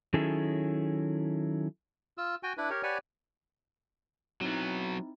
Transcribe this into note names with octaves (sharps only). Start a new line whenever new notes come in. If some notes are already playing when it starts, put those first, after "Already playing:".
D#3 F#3 C#4 E4 G#4 A4
F4 E6
F#4 G5 G#5
D4 E4 B4
G4 A#4 C#5
G4 B4 C#5 D5 F#5 G#5
F#3 B3 C4 D#4 E4